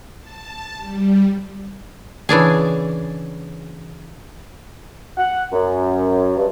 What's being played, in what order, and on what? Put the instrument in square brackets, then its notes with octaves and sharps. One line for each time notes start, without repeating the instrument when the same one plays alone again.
[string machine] A5
G3
[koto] C#3 E3 D4 G#4
[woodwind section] F#5
F#2
G2